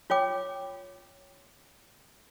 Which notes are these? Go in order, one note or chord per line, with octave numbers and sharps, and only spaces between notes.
F4 C#5 G5 D6